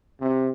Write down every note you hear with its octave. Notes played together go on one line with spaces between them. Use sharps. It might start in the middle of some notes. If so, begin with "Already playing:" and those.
C3